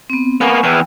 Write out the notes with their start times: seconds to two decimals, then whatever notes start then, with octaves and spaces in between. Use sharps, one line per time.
0.10 B3 C4
0.41 A#3 B3 G#5 C#6
0.64 E2 E3 G5